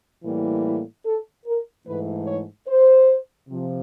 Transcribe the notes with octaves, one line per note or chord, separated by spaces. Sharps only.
A2 E3 G3 A#3
E4
A4
A#4
G#2 E3 A3 B4
C#5
C5
C3 F3